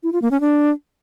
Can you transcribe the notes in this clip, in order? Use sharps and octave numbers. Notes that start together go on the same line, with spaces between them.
E4
F4
A#3
C#4
D4